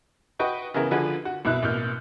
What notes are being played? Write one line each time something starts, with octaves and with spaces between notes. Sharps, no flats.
F#4 B4 D#5 G5 C#6
C#3 E3 B3 G#4 A#4
D3 F3 F#4 G#4 B4
F#4
C2 B2 E4 F#6
A1 B2 A#3 F6 G6